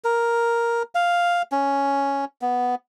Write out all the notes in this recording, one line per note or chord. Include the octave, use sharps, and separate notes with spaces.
A#4
F5
C#4
B3